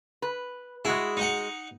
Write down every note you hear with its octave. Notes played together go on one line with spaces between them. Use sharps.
B4
G#3 E4 F#4 G#4
D#4 F#5